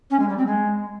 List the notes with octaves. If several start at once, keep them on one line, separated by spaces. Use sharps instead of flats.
C#4
G#3
G3
C4
G#3